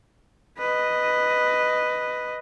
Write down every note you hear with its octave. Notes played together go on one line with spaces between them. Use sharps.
B4 D#5